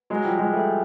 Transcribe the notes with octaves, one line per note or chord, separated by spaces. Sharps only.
F#3 G#3
F3 G3
F#3 G#3
G3 A3